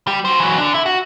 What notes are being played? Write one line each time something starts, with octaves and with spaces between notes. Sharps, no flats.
G3
F#4 C5
E3 F#3
D3 D4
E4
F#4